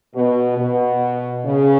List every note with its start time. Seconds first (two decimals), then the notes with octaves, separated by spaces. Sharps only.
0.15 B2
0.58 B2
1.46 C#3